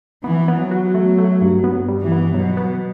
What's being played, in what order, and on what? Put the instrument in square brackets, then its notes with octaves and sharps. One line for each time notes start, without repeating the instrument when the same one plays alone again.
[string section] E3 [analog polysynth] B3
[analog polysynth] B3
[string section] F#3
[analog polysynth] F#4
A3
A3
G2
B3
G3
[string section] E3
[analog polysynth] B3
[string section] B2 [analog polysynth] F#3
[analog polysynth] B3